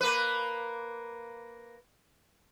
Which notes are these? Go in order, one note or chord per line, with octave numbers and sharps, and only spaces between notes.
A#3 B4